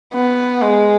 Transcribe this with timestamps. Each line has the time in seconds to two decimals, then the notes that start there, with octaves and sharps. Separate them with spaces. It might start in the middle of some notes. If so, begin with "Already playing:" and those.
0.14 B3
0.62 G#3